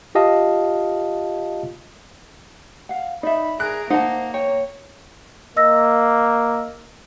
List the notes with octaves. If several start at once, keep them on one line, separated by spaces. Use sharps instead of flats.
F4 G4 D#5 F5 A5
F5 F#5
D#4 D5 E5 B5
G#4 A#4 F#6 D7
A#3 D#4 C5 F#5 A5
C#5 G5
A#3 D#5 E6 A#6